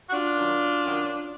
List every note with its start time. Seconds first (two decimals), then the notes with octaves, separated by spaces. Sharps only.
0.10 F#4
0.12 D4 F4
0.36 F#2 D#3 F#3
0.83 F#2 D#3 F#3